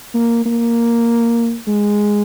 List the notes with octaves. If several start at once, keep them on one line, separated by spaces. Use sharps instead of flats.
A#3
A#3
G#3